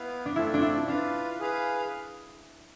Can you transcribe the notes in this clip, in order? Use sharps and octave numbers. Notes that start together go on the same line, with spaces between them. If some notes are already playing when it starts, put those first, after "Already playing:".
Already playing: B3 E4 B4 F5
D4
A3 C4 E4 F4 A4 E5
D4
E4
D4 F4 B4 F5
G#4 B4 F5